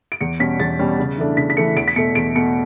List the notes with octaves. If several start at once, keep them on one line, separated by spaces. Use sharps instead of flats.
D7
E2 C#7
B2 G3 C#4 B6
E2 A6
B2 G3 C#4
C#3
E3 A3 D4
C#3 B6
B6
E3 A3 D4 C#7
E2 D7
B6
B2 A3 C#7
E2 D7
B2 A3 C#7